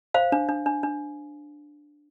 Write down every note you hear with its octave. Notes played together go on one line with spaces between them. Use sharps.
C5 F5
D4
D4
D4
D4